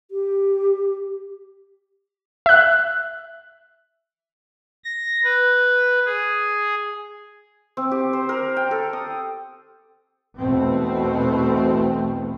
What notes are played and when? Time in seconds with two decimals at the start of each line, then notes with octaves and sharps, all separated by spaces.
0.11 G4
2.46 E5 F#6
4.84 A#6
5.24 B4
6.06 G#4
7.77 C4
7.91 G4
8.13 C5
8.29 A#4
8.56 G5
8.71 A4
8.93 D#6
10.38 B1 E2 B2 A3 B3 C4